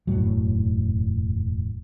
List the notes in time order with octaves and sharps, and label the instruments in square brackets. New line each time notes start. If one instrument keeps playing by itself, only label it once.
[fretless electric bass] E1 F#2 A2 F#3